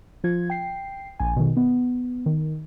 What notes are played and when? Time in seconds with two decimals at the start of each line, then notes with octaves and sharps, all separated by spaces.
0.24 F3 F4 G#6
0.50 G5 C7
1.19 A#1 G#5
1.36 B2 D#3
1.57 B3
2.26 D#3